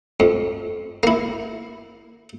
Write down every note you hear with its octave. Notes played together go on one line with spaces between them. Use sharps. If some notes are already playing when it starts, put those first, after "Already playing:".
F2
A#3 E4